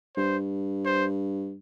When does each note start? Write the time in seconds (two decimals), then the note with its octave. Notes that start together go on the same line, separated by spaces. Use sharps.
0.17 G2 C5
0.85 C5